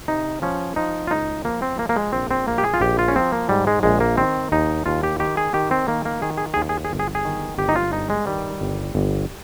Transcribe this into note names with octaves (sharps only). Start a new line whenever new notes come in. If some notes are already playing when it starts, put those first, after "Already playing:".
C3 D#4
F3 C#4
F3 D#4
F4
C#2 D#4
F3 A#3
C4
F3 A#3
A#3
G#3
A#1 C4
C4
A#1 A#3
G4
G#4
F4
A#1 G4
F4
C#4
F3 C4
A#3
G#2 G3
G#3
A#1 G#3
A#3
D#3 C4
D#2 D#4
D#2 F4
G4
D#3 G4
G#4
D#3 G4
C4
D#3 A#3
A#3
D#3 G#4
G#4
D#2 G#4
G#4
G#4
G1
G#4
G#4
D#3
G1 G4
D#4
F4
G2 D#4
G#3
D#3 G3
G1
G1